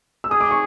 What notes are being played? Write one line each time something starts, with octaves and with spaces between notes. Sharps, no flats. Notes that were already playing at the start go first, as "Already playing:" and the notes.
E6
G#4 D#6
D6
C#6